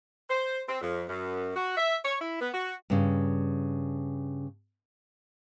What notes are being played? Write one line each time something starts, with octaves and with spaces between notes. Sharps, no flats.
C5
C4
F2
F#2
F#4
E5
C#5
E4
B3
F#4
G2 C#3